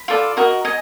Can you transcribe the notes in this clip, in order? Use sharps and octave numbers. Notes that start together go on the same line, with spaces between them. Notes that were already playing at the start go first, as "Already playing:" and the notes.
Already playing: B5
F4 A4 D5
F#4 A#4 D#5 A#5
D#5 G#5